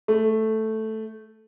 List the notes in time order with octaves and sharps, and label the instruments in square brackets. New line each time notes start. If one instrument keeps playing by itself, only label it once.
[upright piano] A3